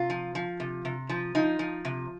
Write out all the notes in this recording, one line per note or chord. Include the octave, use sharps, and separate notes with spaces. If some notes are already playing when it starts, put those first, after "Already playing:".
Already playing: C3 F4
F3
F3
C3
C3
F3
F3 D#4
F3
C3